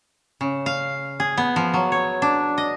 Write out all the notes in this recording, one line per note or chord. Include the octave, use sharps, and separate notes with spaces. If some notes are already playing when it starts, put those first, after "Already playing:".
C#3
F5
G#4
B3
F3
F#3
C#5
D4
D#5